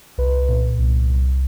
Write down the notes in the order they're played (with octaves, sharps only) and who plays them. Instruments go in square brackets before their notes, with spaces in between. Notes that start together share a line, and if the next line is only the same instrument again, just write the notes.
[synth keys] C2 B4
A#2
C2
C2